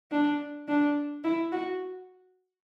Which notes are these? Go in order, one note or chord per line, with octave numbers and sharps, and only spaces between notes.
D4
D4
E4
F#4